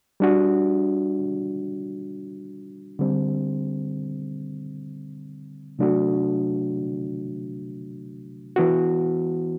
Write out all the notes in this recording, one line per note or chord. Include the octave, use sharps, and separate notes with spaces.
G3 D4 F#4
D3 G3 C4
C3 F#3 A3 D4 F#4
E3 B3 F#4